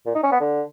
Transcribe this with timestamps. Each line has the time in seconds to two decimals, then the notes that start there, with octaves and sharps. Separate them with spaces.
0.06 A#2
0.15 D#4
0.23 C#4
0.32 B3
0.40 D3